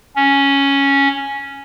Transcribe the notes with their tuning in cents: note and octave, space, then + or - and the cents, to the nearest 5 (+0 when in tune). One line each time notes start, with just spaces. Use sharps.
C#4 +0